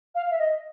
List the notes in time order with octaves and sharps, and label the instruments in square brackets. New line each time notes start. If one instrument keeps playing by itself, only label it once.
[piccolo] F5
E5
D#5